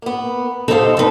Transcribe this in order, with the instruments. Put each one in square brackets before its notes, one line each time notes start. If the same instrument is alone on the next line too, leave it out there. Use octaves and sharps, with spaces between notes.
[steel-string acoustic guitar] A#3 B3
[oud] D#4 G4 [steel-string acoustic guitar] A4 C5 F5
[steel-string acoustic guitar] D3 C4 [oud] A4 B4